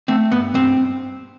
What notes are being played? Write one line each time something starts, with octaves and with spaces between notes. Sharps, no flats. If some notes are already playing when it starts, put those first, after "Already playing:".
A3 C4
G2 B3
G2 C4